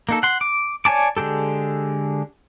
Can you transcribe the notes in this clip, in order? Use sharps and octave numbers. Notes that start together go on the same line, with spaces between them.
A#3 D#4 A4
F#5 C6
D6
C#5 D5 G#5 A5 D6
D3 G#3 G4 A4